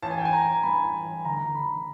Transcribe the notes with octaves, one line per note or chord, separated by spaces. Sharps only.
A1 A5
G#5
G5
A1 G#5
A#5
A1
G2 B5
A1
A1
D2 A#5
D2
B5
D2